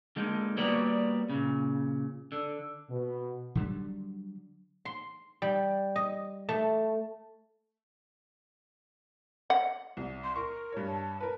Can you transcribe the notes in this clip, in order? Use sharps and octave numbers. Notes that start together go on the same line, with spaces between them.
D3 G#3 A#3 D#4
G3 A#3 B3 F#4 C#5 D5
A#2 C#3
D3
B2
D3 F#3 G3
C6
G3
D#5
A3
F#5
C2
C6
A#4 C#6
G2 C#5
A5
A#4 B4